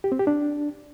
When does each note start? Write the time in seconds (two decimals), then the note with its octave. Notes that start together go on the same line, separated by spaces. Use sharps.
0.04 G4
0.12 C4
0.19 G4
0.27 D4